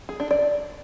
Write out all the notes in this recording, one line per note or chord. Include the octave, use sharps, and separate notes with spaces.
G#4
D4
D5